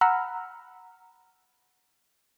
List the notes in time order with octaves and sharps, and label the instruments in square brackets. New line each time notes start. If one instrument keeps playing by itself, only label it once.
[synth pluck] F#5 A#5 B5 E6 F6